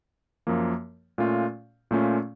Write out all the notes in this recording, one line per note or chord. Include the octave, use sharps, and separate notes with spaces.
F#2 F3 A#3
A#2 A3 C#4 F4
A#2 A3 C#4 F4